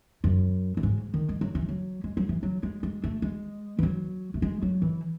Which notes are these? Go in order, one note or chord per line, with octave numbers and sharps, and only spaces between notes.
F#2
F#2
G#2
D#3
G#3
F#3
E3
F#3
G#3
F#3
E3
F#3
G#3
G#3
A3
G#3
E3
F#3
A3
G#3
F#3
E3